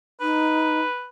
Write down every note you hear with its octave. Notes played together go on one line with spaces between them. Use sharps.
D#4 B4